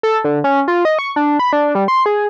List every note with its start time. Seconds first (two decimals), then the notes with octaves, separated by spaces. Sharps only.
0.03 A4
0.25 D3
0.44 C#4
0.68 F4
0.85 D#5
0.99 C#6
1.16 D4
1.39 B5
1.53 D4
1.75 G3
1.88 C6
2.06 G#4